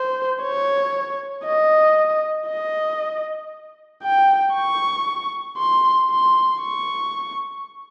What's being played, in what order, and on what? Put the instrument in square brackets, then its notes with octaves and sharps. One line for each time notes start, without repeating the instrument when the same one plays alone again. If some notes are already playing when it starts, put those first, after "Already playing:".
Already playing: [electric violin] C5
C#5
D#5
D#5
G5
C#6
C6
C6
C#6